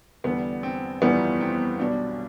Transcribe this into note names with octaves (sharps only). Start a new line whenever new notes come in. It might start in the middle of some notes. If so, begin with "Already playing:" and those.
E2 D3 G3 B3
C4
G1 F2 E3 G3 B3
C4
B1 B2 G3 D4